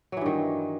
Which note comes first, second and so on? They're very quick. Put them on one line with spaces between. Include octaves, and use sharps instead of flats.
F#3 E3 G2 D#3